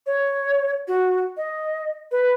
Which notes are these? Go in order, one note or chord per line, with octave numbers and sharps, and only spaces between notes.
C#5
F#4
D#5
B4